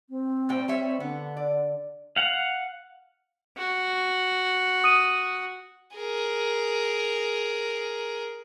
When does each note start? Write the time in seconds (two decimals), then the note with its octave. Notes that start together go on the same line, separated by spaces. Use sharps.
0.09 C4
0.49 A2 G3 G5
0.68 G3 C#5 E5
1.00 D3 B3
1.37 D5
2.16 F5 F#5
3.58 F#4
4.84 D#6 D#7
5.96 G#4 A#4